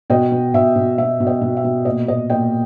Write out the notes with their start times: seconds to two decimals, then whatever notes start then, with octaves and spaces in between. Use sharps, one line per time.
0.10 B2 D#5 G5
0.32 B2
0.54 B2 E5
0.76 B2
0.98 B2 E5
1.20 B2
1.27 D#5 G5
1.41 B2
1.57 E5
1.64 B2
1.85 A#2 D#5
2.07 A#2 D#5
2.30 A#2 D#5 G5